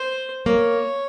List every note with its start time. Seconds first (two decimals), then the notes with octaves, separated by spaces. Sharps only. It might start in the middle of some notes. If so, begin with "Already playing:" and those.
Already playing: C5
0.46 A#3 C#5